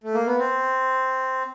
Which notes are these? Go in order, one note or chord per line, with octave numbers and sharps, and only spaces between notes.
A3
A#3
B3
C4